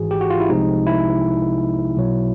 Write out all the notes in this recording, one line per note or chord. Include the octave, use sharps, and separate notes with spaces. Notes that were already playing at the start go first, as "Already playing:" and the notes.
Already playing: G#1 G#2 E3 F#4 G#4
G4
F#4
F4
E4
C2 C3 F3 G#3 D#4
E4
B1 B2 F#3